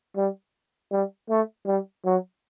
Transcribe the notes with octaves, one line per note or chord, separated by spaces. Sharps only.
G3
G3
A3
G3
F#3